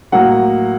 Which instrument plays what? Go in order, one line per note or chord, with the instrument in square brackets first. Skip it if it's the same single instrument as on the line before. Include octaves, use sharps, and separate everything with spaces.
[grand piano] A2 F#3 A#3 F#5